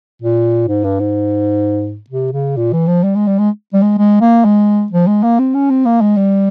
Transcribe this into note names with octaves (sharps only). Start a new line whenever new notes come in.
A#2
G#2
G2
G#2
C3
C#3
A#2
E3
F3
G3
G#3
G3
G#3
G3
G#3
G#3
A#3
G#3
F3
G#3
A#3
C4
C#4
C4
A#3
G#3
G3